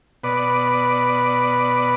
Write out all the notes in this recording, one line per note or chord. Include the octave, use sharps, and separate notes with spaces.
B2 B4 D5